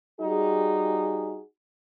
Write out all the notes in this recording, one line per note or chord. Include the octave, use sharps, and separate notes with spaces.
G3 D#4 F#4 G#4